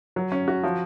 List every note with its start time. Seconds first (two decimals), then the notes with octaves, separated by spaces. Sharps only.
0.16 F#3
0.32 C#4
0.48 F#4
0.63 F3